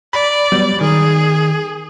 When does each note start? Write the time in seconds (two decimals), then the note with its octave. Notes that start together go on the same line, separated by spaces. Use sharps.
0.13 D5 B5
0.52 F#3 G3 B3
0.81 D#3 G#4